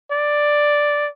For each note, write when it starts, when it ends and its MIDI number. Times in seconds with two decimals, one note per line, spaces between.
0.12 1.08 74